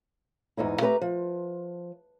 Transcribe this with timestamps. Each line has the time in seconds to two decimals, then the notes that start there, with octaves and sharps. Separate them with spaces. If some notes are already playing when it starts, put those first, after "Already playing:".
0.57 E2 G#2 D#4 E4
0.81 A3 G4 B4 A5 A#5
1.01 F3